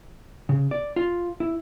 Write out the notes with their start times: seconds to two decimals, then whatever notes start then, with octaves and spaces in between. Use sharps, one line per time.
0.49 C#3
0.71 D5
0.96 F4
1.40 E4